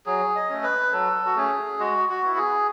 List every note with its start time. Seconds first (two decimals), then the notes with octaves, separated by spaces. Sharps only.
0.06 F#3 G#4
0.35 D#5
0.49 A3 C#4
0.63 B4
0.92 F#3 A4
1.26 F#4
1.36 A3 C#4 G#4
1.79 G#3 F#4
2.09 F#4
2.23 B3 E4
2.37 G#4